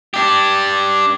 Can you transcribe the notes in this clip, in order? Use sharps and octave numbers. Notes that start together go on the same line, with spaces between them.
D4 G4